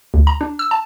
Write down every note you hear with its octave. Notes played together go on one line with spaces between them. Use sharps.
D2
A#5
D4
E6
A5